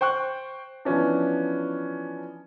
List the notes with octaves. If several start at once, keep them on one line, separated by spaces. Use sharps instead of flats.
C5 G5 C#6 F#6
E3 F3 B3 C#4 D4